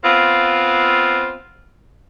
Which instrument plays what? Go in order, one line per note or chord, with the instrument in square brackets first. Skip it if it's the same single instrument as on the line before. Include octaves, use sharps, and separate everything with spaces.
[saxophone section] B3 C4 F4